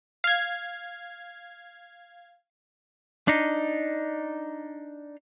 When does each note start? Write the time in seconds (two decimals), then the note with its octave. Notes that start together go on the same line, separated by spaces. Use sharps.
0.24 F5 G#6
3.28 D4 D#4